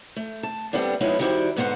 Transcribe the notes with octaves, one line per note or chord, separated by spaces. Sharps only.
A3
A5
G3 A3 B3 C4 D4
F3 G#3 B3 C#4 D#4 E4
D#3 G3 E4 F#4 C5 D5
G#2 D3 B3 F#4 C5 F#5